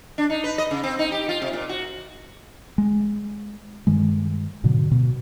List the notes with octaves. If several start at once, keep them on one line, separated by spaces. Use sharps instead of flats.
D4
D#4
B4
D#5
C#3
C4
D#4
G4
F4
C3
A#2
F#4
G#3
G2 D#3 G#3
G#2 B2 D3 F#3
B2